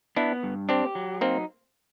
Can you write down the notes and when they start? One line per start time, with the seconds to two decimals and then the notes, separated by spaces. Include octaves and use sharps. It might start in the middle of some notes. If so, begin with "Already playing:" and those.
0.16 B3 D4 E4
0.43 G2
0.69 C4 D4 G4
0.95 F#3
1.21 A#3 C4 D#4